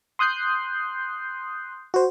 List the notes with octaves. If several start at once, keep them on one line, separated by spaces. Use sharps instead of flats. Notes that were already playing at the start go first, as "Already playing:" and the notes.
C6 D#6 F#6 G6 C7
F#4 C5